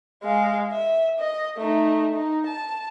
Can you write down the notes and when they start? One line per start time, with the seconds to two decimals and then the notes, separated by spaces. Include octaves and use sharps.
0.24 G#3 F5
0.72 E5
1.19 D#5
1.58 A3 D#4
2.14 D#4
2.46 A5